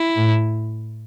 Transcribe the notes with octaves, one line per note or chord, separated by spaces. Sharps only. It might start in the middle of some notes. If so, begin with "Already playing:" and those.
Already playing: E4
A2